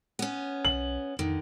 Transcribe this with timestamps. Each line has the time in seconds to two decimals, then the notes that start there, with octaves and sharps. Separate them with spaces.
0.19 B3 C#4
0.65 B1 F#7
1.19 F2 D3 D#3